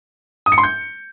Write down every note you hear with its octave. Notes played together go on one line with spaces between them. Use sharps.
D#6
C#7
C6
G6